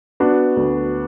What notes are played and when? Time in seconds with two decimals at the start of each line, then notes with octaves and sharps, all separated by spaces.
0.20 B3 D4 F#4
0.57 D2